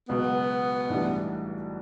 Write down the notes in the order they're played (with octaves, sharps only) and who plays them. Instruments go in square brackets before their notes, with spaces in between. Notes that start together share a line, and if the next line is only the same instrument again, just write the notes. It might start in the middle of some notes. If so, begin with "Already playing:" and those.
[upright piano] C#2 B2 F#3 [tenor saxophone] B3
[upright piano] B1 A2 E3 G3 D4